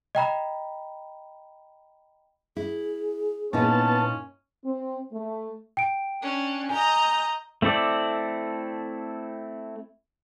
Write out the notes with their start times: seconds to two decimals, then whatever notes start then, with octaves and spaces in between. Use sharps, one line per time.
0.15 D#5 G5 A#5 B5
2.57 E4 G#4
3.53 A#2 B3 C#4 D#4 E4 A5
4.64 C4
5.12 A3
5.77 G5 D7
6.22 C#4 D4
6.69 D#5 G#5 A#5 G6
7.62 A3 C4 E4 A4 D5